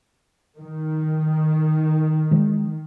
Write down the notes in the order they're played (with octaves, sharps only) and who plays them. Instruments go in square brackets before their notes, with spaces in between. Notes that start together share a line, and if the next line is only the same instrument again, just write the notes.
[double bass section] D#3
[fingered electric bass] E3 G#3